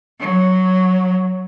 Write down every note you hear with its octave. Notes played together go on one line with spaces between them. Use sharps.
F#3